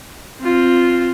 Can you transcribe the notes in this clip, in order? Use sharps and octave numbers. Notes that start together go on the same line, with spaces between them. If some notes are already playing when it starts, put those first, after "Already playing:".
C4 F4